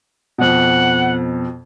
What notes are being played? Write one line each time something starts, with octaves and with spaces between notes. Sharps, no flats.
F2 B2 F#5